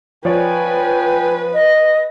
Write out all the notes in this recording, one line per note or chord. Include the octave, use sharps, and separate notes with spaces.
F3 B4 C#5 D5 G5 G#5
D#5